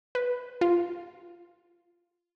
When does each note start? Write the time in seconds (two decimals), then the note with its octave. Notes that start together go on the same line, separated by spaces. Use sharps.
0.15 B4
0.61 F4